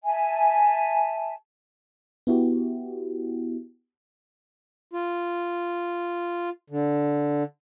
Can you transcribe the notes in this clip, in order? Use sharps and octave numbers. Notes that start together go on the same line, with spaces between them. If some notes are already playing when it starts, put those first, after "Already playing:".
E5 G#5 A5
B3 E4 F#4 G4
F4
D3